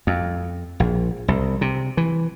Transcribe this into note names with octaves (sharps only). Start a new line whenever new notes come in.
F2
A#1
C2
C3
E3